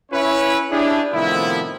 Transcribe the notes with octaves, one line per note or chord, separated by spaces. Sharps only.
C#4 E4 B4 C#5
D4 E4 G4 G#4
A2 C3 D#3 F3 B3 E4